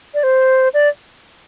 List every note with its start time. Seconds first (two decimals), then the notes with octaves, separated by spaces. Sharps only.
0.14 D5
0.23 C5
0.74 D5